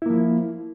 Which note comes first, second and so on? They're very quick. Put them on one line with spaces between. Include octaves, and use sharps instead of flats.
E4 A#3 F3